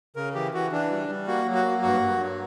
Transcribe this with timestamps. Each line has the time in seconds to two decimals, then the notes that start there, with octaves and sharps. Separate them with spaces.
0.16 C#3 A#4
0.35 E3 G4
0.54 E3 F#4
0.72 E3 D4
0.91 G3
1.09 G3
1.28 A#3 F#4
1.46 F#3
1.55 F#4
1.65 A#3
1.83 G2 F#4
2.01 G2
2.20 F#3